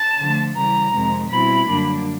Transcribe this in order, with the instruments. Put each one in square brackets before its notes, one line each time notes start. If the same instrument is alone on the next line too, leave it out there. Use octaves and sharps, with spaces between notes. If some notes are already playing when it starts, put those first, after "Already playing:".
Already playing: [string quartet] A5
D3 F3 A3
C#3 E3 G3 A#5
F2 C3 D#3 G#3
B2 G3 C4 E4 B5
F#2 D3 G3 A#3 D4